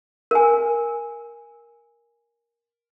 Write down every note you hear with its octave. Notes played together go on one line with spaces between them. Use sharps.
A#4 G#5